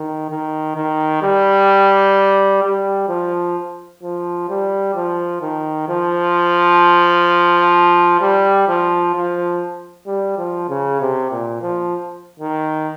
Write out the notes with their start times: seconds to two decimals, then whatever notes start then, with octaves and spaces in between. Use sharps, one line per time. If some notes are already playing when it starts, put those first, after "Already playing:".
Already playing: D#3
0.30 D#3
0.76 D#3
1.22 G3
2.63 G3
3.08 F3
4.02 F3
4.49 G3
4.95 F3
5.42 D#3
5.89 F3
8.21 G3
8.68 F3
9.14 F3
10.07 G3
10.38 F3
10.69 C#3
11.00 C3
11.31 A#2
11.62 F3
12.40 D#3